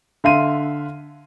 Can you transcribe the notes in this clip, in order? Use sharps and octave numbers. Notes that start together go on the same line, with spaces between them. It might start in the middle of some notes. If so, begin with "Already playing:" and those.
D3 E5 F5 C6 D#7